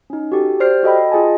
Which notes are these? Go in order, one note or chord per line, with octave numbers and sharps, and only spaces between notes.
C#4 D#4
F#4 G4 A4
G4 C5 D5 F6 C7
F#4 A4 D#5 G5 B5
F4 G#4 D#5 G#5 A5